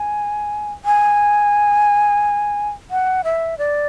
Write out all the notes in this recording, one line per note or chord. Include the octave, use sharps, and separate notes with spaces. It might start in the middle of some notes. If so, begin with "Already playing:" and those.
Already playing: G#5
G#5
F#5
E5
D5